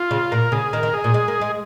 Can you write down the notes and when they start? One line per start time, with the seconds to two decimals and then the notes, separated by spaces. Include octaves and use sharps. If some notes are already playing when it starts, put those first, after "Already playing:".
Already playing: F4
0.11 C#3
0.32 A#2 A#4
0.52 C#3 G#4
0.73 D#3 A#4
0.83 D#3
0.93 G#4
1.04 A#2
1.14 G#3
1.28 A#3
1.41 G#3